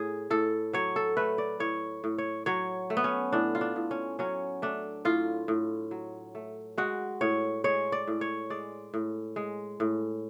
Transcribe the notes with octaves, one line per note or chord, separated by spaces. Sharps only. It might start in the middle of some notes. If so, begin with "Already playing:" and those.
Already playing: A2 G#4
A2 A4
F#3 C#5
A4
A3 B4
D5
A2 C#5
A2
C#5
F#3 C#5
A3
B3
C#4
A2 D4
F4
D4
A2
C#4
F#3 C#4
A3 D4
A2 F4
A2
F#3
A3
G#3 F#4
A2 C#5
G#3 C#5
D5
A2
C#5
G#3 D5
A2
G#3
A2